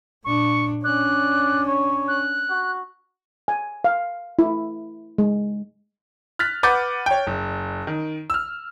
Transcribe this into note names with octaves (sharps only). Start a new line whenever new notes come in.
A#2 D4 C#6
C#4 D4 D5 F#6
C#5
F#6
F#4
G#5
F5
E4
G#3
F6 F#6 A6 B6
B4 F#5 D6 G6 A6
C#5 G5
F#1
D#3
E6 F6